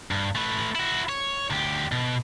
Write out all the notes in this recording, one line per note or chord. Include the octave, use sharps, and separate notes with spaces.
G2
A3 B4
E4 F#4
C#5
D2 G4
B2